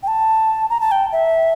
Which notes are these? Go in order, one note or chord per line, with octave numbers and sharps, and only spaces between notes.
G5
A5
A#5
A5
G5
E5